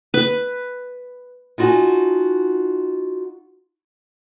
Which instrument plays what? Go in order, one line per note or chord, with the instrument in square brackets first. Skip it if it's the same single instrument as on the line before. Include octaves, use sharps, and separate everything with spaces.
[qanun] B4
[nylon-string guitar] D#4 F4 F#4 F#5 G#5 A5